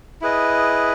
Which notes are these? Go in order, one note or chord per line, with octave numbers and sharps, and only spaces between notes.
E4 G#4 B4 D#5